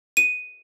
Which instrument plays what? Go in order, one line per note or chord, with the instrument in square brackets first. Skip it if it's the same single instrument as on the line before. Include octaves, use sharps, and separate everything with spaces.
[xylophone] D#7